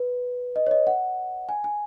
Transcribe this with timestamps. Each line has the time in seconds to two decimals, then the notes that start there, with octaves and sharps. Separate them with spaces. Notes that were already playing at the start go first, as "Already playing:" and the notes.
Already playing: B4
0.56 D#5
0.67 C#5
0.71 D#5
0.87 F#5
1.49 G#5
1.64 G#5